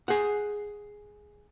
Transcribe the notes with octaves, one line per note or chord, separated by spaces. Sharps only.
G#4 F#5